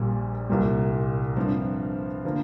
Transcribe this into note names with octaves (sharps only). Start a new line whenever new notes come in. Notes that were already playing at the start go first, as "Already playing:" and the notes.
Already playing: A#1 A#2 G3 A#3
C2 A#2 G3
G2 F3 C4
D3 F3 A#3